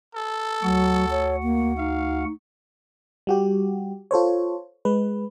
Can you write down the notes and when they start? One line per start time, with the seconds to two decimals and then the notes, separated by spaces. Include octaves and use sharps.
0.15 A4
0.63 D2 F#3 F#4 F#5
1.11 C#5
1.43 A#3
1.78 D#4 F5
3.27 G3 F#4 G4
4.11 F4 A4 C5 C#5
4.85 G#3 B4